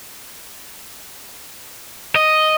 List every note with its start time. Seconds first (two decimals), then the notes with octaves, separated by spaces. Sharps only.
2.16 D#5